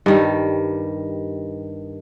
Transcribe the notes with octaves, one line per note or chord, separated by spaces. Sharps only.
G2 D#3 G3